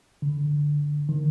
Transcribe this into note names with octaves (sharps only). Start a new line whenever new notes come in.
D3
D#3